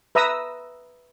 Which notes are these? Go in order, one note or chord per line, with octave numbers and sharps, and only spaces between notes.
B4 E5 A#5 D#6 E6